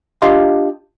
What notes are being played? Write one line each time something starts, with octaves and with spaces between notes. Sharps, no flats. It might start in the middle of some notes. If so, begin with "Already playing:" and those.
D4 F4 G4 D#5 F5 C6